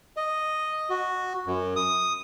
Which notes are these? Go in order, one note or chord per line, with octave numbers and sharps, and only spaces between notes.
D#5
F#4
F#2
D#6